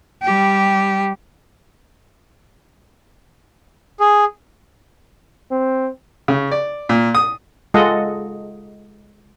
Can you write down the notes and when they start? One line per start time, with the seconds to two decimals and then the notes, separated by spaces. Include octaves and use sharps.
0.23 G3 G4
4.00 G#4
5.51 C4
6.28 C#3
6.51 D5
6.89 A#2
7.15 D#6
7.74 G#3 F4 A4 D#5 F#5